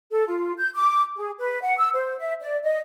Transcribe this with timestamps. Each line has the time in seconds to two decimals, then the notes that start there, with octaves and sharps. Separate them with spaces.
0.11 A4
0.27 F4
0.58 G6
0.74 D6
1.16 G#4
1.38 B4
1.62 F#5
1.78 E6
1.93 C5
2.19 E5
2.41 D5
2.63 D#5